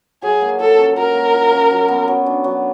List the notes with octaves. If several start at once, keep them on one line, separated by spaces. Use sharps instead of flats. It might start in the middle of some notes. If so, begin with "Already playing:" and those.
F#3 G#4
A#3
F4 A4
C#4
F#3 A#4
A#3
F4
C#4
F#3
B3
F#3
D4
F#3